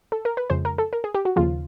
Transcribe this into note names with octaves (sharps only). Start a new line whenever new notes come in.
A4
A#4
B4
F2 C#3 F3 G#3 C5
A#4
A4
A#4
G#4
G4
F#4
D#2 C#3 F3 F4